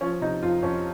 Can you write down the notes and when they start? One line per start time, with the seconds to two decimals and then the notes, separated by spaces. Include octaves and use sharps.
0.01 F3 C#4
0.21 C3 D#4
0.42 F2 F4
0.62 F2 C#4